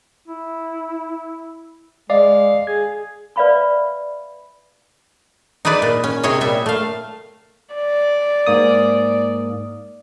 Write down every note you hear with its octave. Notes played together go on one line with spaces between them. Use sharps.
E4
G#3 D5 D#5 F5
G#4 G#6
B4 D5 E5 F5 B5 C#6
D#4 E4 G#4 B4 D5
A#2
C#4
C3 E4 G#4 C#5 D#5
A#2 G3 E5
A3 F5
D5
G#2 A#3 D#6